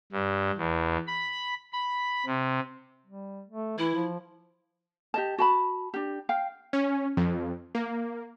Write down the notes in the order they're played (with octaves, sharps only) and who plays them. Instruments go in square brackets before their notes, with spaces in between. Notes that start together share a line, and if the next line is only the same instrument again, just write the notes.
[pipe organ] G2
E2
B5
B5
C3
[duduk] G3
A3
[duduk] E3 [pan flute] E4
[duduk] F3
[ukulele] G4 D#5 A5
F#4 A5 B5
D4 G4
F5 G5
[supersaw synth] C#4
F2
A#3